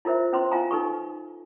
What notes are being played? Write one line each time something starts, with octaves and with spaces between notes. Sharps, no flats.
E4 F4 A#4 C5 E5
C#4 E4 B4 C5 C6
E4 F4 F5 G#5 A#5
D#4 A4 B4 C#6